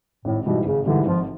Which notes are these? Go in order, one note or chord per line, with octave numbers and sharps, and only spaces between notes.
G#1 A2
G#2 B2 E3 G3
G#1 C#3
G#2 D3 E3 G3
G#1 F3